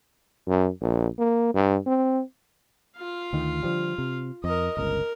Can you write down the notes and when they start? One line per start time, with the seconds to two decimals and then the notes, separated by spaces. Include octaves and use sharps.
0.48 F#2
0.81 A#1
1.18 A#3
1.54 G2
1.86 C4
2.97 F4 F5
3.33 D2 D#3
3.63 D3 F3 G3
3.98 C3
4.44 F2 A#4 D#5
4.77 G1 C#2 A#4